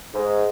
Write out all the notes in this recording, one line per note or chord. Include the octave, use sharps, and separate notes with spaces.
G#2